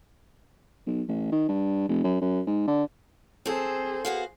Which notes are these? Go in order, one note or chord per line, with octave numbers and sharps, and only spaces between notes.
B1
A1
D#3
G2
F1
F#2
F#2
G#2
D3
C4 G#4 A4 C5
B3 F#4 F5